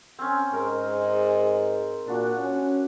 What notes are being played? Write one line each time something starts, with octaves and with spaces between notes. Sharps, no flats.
C4 C#4
G#2 A#4 C5
A#2 D4 F#4
C#4